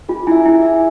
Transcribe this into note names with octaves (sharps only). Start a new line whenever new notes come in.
F4 G#4
E4 E5 G#5
E4 G#4
E5 G#5